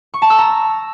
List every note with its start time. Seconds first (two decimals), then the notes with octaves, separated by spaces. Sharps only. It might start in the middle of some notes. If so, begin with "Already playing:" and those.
0.14 C#6
0.22 A5
0.30 E6
0.38 A#5